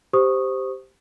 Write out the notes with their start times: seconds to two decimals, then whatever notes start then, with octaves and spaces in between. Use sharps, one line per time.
0.13 G4 C5 C#6 D#6